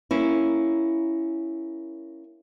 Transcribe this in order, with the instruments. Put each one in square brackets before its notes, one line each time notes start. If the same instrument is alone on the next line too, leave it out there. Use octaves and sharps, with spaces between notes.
[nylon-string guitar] A#3 C#4 E4